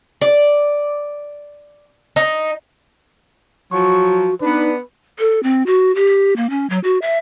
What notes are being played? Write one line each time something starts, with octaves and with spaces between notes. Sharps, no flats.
D5
D#4
F3 F#3 F#4 C#6
B3 D4 D#4 B4
A4
C4
F#4
G4
A#3
C#4
F#3
F#4
E5